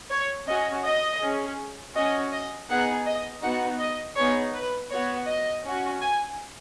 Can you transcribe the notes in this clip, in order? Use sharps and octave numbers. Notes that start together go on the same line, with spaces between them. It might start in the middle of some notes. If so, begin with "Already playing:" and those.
C#5
C#4 F#4 D#5
D#5
C#4 G#4
C#4 F#4 D#5
D#5
B3 D#4 G#4 F#5
D#5
B3 D#4 F#4 F#5
D#5
B3 D#4 G#4 C#5
B4
B3 F#4 C#5
D#5
C#4 F#4
G#5